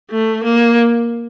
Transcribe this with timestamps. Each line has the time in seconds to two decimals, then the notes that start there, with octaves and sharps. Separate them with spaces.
0.11 A3
0.44 A#3